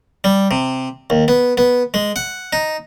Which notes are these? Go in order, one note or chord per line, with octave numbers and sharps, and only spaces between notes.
G3
C3
D#2
B3
B3
G#3
F#5
D#4